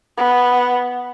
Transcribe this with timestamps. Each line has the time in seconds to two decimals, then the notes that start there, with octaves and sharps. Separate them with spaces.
0.18 B3